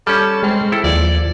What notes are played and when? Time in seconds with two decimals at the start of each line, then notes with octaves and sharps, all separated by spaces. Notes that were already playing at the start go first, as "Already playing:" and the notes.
0.07 G3 C#4 A4
0.43 G#3 C4
0.72 E4 A4
0.84 D#2 F3 D5